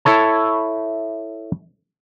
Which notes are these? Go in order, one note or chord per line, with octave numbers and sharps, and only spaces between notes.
E4 A4 C#5 A5